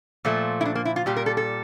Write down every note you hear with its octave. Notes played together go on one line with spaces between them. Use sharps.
A#2 F3 A3
E4
D4
A#3
E4
F4
A#2 G3 G4
A#4
A4
A4